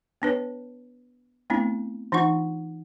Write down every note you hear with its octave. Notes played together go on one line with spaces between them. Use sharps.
B3 D4 B4 C#5
A3 B3 C4 D4 E4
E3 D4 D#4 F4 F#5 C#6